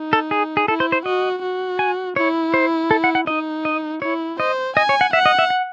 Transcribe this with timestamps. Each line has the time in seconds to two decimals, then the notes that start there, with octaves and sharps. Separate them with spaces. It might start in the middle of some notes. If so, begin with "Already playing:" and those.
Already playing: D#4
0.13 A4
0.31 G#4
0.57 G#4
0.68 E4 A4
0.80 C5
0.92 C5
1.06 F#4 D#5
1.42 F#4
1.79 G#5
2.16 E4 C#5
2.54 C5
2.91 A4
3.04 F#5
3.15 F#5
3.27 D#4 D#5
3.65 D#5
4.02 E4 C#5
4.40 C5 D#5
4.77 D#5 G#5
4.89 C#5
5.01 F#5
5.13 E5 F#5
5.26 D#5
5.39 E5
5.50 F#5